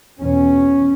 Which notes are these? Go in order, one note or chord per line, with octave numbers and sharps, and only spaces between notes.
E2 B2 C#4